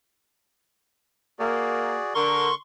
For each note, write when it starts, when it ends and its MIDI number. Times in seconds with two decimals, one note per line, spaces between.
1.39 1.97 58
1.39 2.14 66
1.39 2.14 68
1.39 2.14 74
2.14 2.50 50
2.14 2.50 70
2.14 2.54 84
2.14 2.54 85